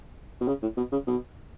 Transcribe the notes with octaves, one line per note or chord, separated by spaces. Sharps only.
B2
C#3
A2
B2
C#3
B2